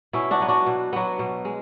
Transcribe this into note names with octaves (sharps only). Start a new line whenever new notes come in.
B2 C#4 E4
D4 F#4
F#3 B3
D4 F#4
B2
F#3 B3
B2
G#3